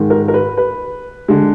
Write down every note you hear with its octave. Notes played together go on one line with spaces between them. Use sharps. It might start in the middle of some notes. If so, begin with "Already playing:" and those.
Already playing: G#2 D#3 G#3
A#4
A#4
B4
B4
D3 G#3